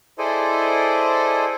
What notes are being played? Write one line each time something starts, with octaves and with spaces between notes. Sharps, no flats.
E4 G#4 A4 C5 D5 D#5